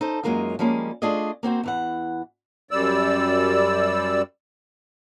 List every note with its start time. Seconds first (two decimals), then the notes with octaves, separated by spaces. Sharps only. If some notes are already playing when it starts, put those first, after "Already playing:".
0.01 D#4 A4 C5
0.23 F#2 F#3 G#3 A#3 D#4 F4
0.59 F3 G3 G#3 A#3 C#4
1.02 A3 D4 F4 G#4 D5 D#5
1.43 A#3 C4 F#4 C5
1.63 E2 E3 F#5
2.71 F#2 G3 D5 E6